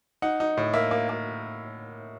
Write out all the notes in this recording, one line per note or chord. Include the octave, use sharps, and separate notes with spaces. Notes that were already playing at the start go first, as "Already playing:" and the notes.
D#4 F#5
D#4
A2
A#3 E5
A#3
A#3